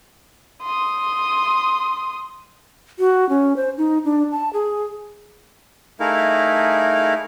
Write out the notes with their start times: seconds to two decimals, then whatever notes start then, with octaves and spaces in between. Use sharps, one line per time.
0.62 C6 D#6
2.99 F#4
3.29 C#4
3.56 C5
3.78 D#4
4.05 D4
4.32 A5
4.53 G#4
6.00 A3 D#4 E4 G#4 A#4 F5